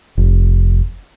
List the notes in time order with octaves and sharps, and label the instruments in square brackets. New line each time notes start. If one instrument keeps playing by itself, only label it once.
[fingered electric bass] F1